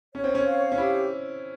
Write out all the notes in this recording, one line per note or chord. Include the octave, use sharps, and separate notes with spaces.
C#4 C#5
C4
C#4
F5
C#4
E4 G4